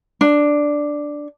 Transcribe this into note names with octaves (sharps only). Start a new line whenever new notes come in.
D4